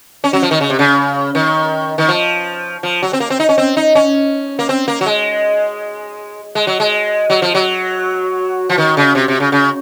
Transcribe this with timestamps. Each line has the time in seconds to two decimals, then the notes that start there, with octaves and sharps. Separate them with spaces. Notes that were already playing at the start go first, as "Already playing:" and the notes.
0.24 C#4
0.33 F#3
0.42 F3
0.51 D#3
0.61 C#3
0.70 C3
0.79 C#3
1.35 D#3
1.98 D#3
2.09 F3
2.83 F3
3.02 F#3
3.13 C4
3.20 A#3
3.30 C4
3.40 D#4
3.49 C#4
3.58 C4
3.77 D#4
3.95 C#4
4.59 A#3
4.69 C4
4.88 A#3
5.01 F#3
5.06 G#3
6.55 G#3
6.67 F#3
6.80 G#3
7.30 F#3
7.42 F3
7.55 F#3
8.69 F3
8.78 D#3
8.97 C#3
9.15 C3
9.28 C3
9.40 C#3
9.52 C#3